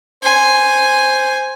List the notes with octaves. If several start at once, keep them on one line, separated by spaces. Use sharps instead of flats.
C5 G#5